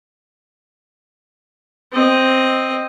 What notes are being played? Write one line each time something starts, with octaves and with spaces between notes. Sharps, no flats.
C4 D#5